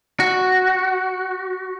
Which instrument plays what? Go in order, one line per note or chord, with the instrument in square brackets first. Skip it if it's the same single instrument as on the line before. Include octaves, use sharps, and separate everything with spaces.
[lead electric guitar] F#4